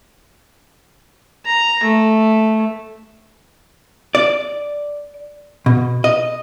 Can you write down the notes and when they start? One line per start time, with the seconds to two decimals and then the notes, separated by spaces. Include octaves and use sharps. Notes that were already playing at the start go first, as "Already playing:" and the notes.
1.46 A#5
1.83 A3
4.15 D5
5.66 B2
6.04 D#5